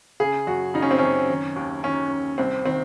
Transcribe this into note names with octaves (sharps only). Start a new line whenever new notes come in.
C#3 G#4
F#2 F#4
C#3 D#4
C#4
C4
F#2 C#4
D#3
D#2
D#3 C#4
D#2
C2 C4
D#3 C4